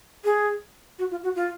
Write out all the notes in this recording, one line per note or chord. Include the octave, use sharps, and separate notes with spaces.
G#4
F#4
F4
F#4
F4